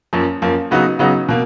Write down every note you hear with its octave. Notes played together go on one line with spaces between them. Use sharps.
F#2 F3 A#3
F#2 F3 A#3
C#3 F#3 B3 D#4 F#4
C#3 F#3 B3 D#4 F#4
B2 A#3